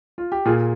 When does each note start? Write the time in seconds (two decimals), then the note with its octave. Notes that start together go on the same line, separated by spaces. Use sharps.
0.18 F4
0.32 G4
0.45 A#2 F4 G#4